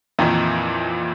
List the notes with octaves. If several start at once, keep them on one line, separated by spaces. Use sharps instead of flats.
F2 A#2 D#3 E3